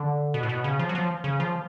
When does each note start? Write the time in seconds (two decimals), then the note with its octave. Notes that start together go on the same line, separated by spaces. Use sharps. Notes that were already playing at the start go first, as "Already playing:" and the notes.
Already playing: D3
0.34 B2
0.43 A2
0.49 B2
0.64 C#3
0.79 F3
0.89 F#3
0.95 F3
1.24 C#3
1.40 F3